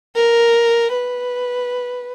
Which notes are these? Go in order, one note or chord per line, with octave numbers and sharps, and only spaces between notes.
A#4
B4